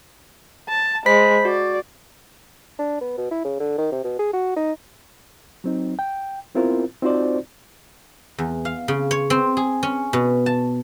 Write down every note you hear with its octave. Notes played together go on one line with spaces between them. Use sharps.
A5
G#3 C5 B5 B6
F#4 D5
D4
B3
B2
E4
C#3
D3
D#3
C3
B2
G#4
F#4
D#4
F#3 C4 D#4
G5
B3 C4 E4 F4 A#4 C5
C4 D#4 F4 F#4 C5 D5
E2
F5
C#3
C#5
C4
G#4
C#4
B2
A5